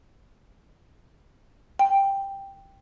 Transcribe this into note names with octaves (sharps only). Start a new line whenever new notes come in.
G5